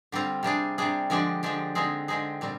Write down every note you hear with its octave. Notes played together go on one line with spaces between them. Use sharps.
D3 G3 C4 F4
C3 G3 D4 G#4
C3 G3 D4 G#4
D3 F3 G#3 D4 G4
D3 F3 G#3 D4 G4
D3 G#3 C4 D#4 G#4
D3 G#3 C4 D#4 G#4
A#2 G3 C4